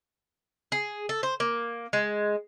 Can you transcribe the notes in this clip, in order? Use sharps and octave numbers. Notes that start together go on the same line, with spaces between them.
G#4
A4
C5
A#3
G#3